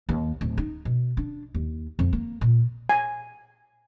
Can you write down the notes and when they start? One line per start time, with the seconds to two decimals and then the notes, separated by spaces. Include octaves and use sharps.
0.09 D#2
0.41 D1
0.58 D#4
0.85 B2
1.17 D4
1.55 D#2
1.99 F2
2.13 A#3
2.41 A#2
2.89 G#5